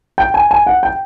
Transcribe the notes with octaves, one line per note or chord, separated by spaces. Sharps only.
G5
G#5
G#5
F#5
G5